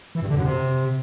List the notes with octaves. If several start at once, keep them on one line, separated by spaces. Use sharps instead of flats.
E3
G2
D3
F#2
C3